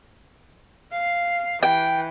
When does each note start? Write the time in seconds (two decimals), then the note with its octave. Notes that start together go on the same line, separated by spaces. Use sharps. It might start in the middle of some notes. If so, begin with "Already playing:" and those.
0.92 F5
1.63 E3 G5